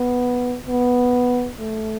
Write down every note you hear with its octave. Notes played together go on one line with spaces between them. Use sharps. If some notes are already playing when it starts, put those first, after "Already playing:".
Already playing: B3
B3
A3